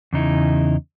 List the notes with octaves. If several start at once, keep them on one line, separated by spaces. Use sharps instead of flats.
E2 C#3 D#4 E4